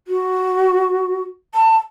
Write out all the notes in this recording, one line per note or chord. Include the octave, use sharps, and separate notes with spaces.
F#4
A5